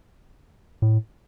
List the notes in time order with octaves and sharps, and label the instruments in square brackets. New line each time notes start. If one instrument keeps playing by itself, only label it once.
[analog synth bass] A2